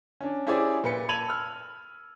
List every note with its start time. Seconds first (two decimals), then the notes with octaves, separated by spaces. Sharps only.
0.21 C#4 D4
0.47 C#4 E4 G4 G#4 C5 D5
0.84 A#2 B4 C#7
1.09 A5 B5 G#6 D#7 F7 F#7
1.28 E6 F6